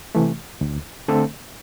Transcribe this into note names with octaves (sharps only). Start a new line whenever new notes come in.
C3 E3 A3
D2
D3 A3 C4 A4